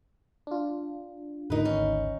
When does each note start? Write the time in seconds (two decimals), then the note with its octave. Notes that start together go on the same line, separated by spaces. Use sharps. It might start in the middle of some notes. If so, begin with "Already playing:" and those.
0.47 D4 F4
1.50 G#1 D2 D#3 D#4 B4
1.65 C#4